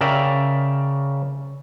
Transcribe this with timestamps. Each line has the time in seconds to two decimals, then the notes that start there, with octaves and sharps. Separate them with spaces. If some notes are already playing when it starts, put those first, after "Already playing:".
0.01 C#3 A#4 D5 E5 G5